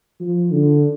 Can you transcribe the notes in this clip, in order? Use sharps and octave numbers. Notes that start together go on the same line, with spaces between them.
F3
D3